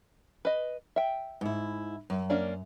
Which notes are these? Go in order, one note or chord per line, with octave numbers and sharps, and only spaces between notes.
B4 D#5
E5 G5
G#2 E4
F#2
A#3 C#4 D4